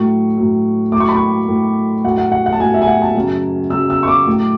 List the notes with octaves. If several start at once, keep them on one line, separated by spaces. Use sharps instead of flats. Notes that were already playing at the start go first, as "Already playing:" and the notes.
Already playing: A2 F#3 C#6
A2 F#3
A2 D6
F#3 C#6
B5
C#6
A2 F#3
A2 F#3 F#5
F#5
F#5
F#5
A5
A2 F#3 G#5
E5
G#5
F#5
A5
F#2 C#3 F#3
F#2 C#3 F#3 E6
E6
C#6
D6
A2 F#3